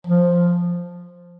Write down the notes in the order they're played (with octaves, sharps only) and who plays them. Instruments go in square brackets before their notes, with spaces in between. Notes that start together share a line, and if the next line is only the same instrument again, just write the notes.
[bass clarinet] F3